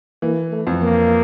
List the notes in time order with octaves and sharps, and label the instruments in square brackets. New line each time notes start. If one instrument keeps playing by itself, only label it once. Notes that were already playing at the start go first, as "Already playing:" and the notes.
[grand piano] E3 [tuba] A#3
[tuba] A3
[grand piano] F2
[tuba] A#3